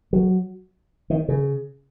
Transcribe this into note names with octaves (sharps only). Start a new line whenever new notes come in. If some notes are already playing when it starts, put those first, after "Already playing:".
F#3
D#3
C#3